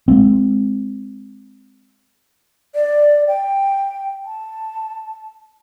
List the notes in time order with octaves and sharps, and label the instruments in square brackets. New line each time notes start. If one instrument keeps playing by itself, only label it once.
[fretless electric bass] G#3 A#3 C4
[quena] D5
G5
A5